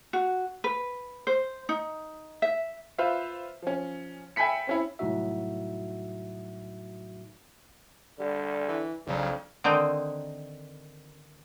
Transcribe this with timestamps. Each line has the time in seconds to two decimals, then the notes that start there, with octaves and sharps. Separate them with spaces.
0.13 F#4
0.64 B4
1.27 C5
1.69 D#4
2.42 E5
2.98 F4 B4 C5 E5 F5
3.62 F3 C#4
4.36 E5 G5 G#5 B5 B6 C#7
4.67 C4 C#4 E4
4.99 C2 A2 F#3 D#4 F#4 E5
8.19 D3 G3
8.68 E3
9.07 B1 F2 C#3 F#3 D4
9.64 D3 D#3 C4 D#4